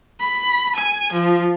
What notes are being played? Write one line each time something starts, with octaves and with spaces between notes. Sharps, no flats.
B5
G#5
F3